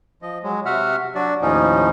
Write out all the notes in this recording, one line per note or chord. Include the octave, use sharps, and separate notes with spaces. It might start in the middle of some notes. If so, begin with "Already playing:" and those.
F3 D#5
F#3 G#3
C3 F#4 E5 F#5 F6
F#3 D4 F#4 D5
D#2 A2 F3 C#4 D#4